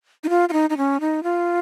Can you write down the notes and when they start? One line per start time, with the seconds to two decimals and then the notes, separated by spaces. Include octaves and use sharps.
0.24 D#4
0.29 F4
0.49 F4
0.53 D#4
0.70 D#4
0.77 C#4
1.00 D#4
1.23 F4